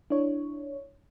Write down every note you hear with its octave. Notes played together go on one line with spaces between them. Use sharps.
D4 E4 C#5